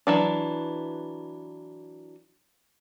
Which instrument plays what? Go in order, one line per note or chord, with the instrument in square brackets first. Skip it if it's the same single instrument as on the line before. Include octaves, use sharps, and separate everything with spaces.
[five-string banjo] E3 F#3 D4